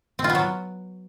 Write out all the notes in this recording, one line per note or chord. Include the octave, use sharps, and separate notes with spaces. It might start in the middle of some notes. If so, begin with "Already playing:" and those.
C4
F4
B3
F#3